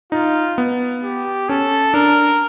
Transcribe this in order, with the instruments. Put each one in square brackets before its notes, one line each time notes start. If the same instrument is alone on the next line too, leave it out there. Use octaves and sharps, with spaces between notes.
[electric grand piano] D#4 [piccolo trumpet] F4
[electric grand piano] B3
[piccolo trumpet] G4
[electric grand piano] C#4 [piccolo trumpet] A4
[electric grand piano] D4 [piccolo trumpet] A#4